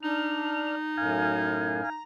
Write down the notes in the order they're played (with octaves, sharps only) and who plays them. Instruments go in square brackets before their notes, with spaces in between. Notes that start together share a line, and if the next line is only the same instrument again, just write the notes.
[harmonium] D4 [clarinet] D#4 [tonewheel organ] F6
[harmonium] F#2 A2 [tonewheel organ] F5 G#5
[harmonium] A#5